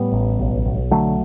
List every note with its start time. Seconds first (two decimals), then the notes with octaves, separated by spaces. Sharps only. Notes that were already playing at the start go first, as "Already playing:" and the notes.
Already playing: A2 G3 B3
0.12 A1
0.39 B1
0.65 B1
0.91 D3 F#3 A3